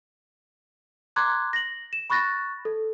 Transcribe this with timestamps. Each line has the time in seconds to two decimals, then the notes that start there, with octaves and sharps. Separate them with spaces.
1.16 A#5 C6 D6 F#6 G#6
1.53 A#6 F#7
1.93 E7
2.10 B5 C#6 F#6 A6 A#6
2.65 A4